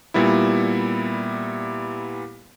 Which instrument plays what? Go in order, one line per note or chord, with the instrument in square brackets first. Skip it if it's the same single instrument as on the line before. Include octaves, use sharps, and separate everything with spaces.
[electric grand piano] A#2 G3 B3 E4